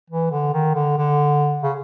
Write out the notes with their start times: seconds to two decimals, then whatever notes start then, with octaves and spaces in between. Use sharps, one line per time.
0.10 E3
0.31 D3
0.53 D#3
0.75 D3
0.98 D3
1.63 C#3